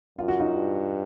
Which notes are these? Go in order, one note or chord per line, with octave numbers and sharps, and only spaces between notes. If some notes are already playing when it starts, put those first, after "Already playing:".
F#2 F4
F#4
D#4 F4
G2